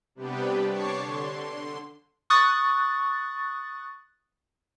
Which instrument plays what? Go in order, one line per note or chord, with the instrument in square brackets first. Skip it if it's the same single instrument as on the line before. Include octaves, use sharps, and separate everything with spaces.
[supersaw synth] C3 G3 B3 D4 G4 B4
D4 C#5 A5 C#6 D6 C7
D3 C6
[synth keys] C#6 D#6 F#6 A6